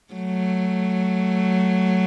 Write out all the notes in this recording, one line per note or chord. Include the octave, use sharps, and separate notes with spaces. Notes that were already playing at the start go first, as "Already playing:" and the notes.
F#3 A3